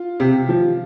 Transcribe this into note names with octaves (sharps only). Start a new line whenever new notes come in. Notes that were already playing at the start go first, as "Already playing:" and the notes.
Already playing: F4
C3
F3